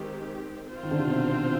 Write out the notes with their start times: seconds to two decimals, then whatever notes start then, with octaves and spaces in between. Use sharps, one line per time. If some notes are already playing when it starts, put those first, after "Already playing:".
Already playing: D#3 G#3 C4 G4
0.72 C4 F4 C5
0.83 D#3
0.91 D3
0.99 C3
1.07 B2